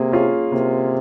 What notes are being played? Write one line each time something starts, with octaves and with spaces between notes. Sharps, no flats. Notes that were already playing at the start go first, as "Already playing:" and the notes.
Already playing: C3 A#3 G#4
C#4 F4 G#4 C#5
C3 A#3